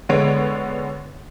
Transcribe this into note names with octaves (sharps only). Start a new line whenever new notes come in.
D3 G#3 B3 C#5 D7